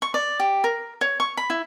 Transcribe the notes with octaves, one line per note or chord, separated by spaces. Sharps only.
C#6
D5
G4
A#4
C#5
C#6
B5
E4